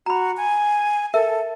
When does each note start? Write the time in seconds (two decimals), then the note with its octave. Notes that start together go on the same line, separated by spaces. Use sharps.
0.06 F#4 A#5 B5
0.37 G#5
1.14 A4 A#4 E5